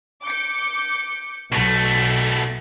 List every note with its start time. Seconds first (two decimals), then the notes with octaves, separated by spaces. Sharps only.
0.23 D6 G6 C#7
1.53 B1 B2 A3